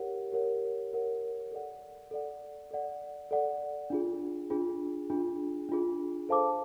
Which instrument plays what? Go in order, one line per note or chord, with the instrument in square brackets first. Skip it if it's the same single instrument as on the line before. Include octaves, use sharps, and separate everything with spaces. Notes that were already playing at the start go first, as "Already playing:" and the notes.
Already playing: [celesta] G4 A#4 C#5 F#5
G4 A#4 C#5 F#5
G4 A#4 C#5 F#5
A4 D5 F#5
A4 D5 F#5
A4 D5 F#5
A4 D5 F#5
D4 F4 G#4
D4 F4 G#4
D4 F4 G#4
D4 F4 G#4
A4 C5 F5 A5 D6